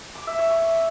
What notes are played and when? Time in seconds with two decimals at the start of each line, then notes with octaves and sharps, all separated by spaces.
0.15 D6
0.27 E5
0.39 C#5
0.51 C#6